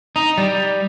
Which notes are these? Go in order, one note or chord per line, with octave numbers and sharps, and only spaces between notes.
D#4
G3